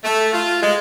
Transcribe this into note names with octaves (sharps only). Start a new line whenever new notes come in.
A3
F4
G#3